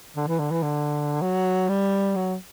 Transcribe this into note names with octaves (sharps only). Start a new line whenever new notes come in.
D3
E3
D3
E3
D3
F#3
G3
F#3